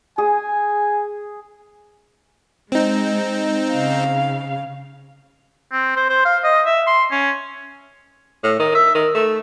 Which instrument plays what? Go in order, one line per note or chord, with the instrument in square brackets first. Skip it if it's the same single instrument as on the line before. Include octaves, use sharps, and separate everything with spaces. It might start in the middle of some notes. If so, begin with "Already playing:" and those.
[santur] G#4 [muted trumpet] G#5
[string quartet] G#3 [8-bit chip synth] C4 D#4
[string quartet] C#3 F5
[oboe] C4
C5
C5
F5
D#5
E5
C6
C#4
[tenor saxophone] A2
D#3
E5
D#3
A3